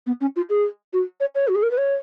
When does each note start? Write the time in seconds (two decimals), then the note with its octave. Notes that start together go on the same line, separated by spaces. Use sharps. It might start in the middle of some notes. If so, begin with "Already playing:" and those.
0.07 B3
0.21 C#4
0.36 F4
0.50 G#4
0.93 F#4
1.20 C#5
1.35 C#5
1.48 F#4
1.55 G#4
1.63 A#4
1.71 B4
1.78 C#5